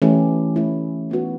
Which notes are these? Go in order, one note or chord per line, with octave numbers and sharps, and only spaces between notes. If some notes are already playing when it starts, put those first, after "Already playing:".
E3 A3 C#4 E4 G4
E3 A3 C#4 E4 G4
G#3 B3 D#4 F#4 B4